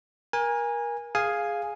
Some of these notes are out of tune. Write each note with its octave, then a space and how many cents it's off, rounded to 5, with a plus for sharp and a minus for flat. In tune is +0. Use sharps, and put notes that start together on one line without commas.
A#4 +25 G#5 -15
G#4 +0 F5 +0 G#5 +0